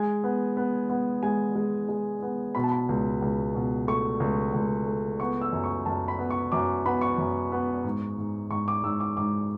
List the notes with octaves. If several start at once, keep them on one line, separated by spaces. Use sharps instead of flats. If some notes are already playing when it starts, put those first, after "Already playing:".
Already playing: G#3 G#5
B3
B3
B3
G#3 G#5
G#3
G#3
B3
B2 B5
A5
B5
C#2
C#2
B2
A3 C#6
C#2
C#2
A3
B3 C#6
E6
F#2
C#6
F#2 A5
B5
B3
C#6
F#2 D6
B3 B5
C#6
F#2
B3
G#2
G#2
G#2 C#6
D6
G#2 E6
D6
G#2 D6